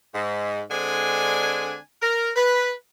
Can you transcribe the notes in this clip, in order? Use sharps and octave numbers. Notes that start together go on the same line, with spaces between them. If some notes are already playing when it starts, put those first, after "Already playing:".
G#2
D3 G#3 C4 D4 G#5
A#4
B4